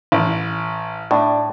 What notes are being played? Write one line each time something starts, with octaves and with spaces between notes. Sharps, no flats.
A1
A2 D4